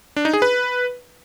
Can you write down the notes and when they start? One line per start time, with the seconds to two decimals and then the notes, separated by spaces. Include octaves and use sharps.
0.16 D4
0.25 D#4
0.33 G#4
0.42 B4